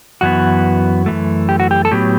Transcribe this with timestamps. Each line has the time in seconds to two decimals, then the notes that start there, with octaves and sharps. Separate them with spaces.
0.21 F#2 E3 B3 F#4
1.06 F#2 E3 A3
1.49 G4
1.60 F#4
1.71 G4
1.85 A4
1.91 A2 F#3 B3 G4